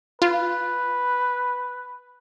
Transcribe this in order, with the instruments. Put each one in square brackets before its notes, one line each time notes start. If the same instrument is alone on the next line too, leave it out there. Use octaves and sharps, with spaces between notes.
[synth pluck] F4 [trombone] B4